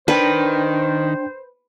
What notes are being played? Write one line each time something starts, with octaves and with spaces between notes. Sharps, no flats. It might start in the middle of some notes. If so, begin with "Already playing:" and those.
D#3 D4 B4 C5 G5